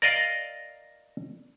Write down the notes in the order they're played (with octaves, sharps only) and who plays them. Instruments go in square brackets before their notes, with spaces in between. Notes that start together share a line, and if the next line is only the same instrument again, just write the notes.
[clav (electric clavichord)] A#4 D5 D#5 F5